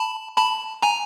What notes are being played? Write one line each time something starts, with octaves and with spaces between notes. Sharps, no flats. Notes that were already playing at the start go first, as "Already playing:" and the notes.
Already playing: A5 B5
A5 B5
G#5 A#5